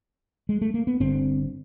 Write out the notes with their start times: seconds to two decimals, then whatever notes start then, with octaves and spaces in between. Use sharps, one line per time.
0.49 G#3
0.61 A3
0.74 A#3
0.87 B3
1.00 G1 G2 D3 C4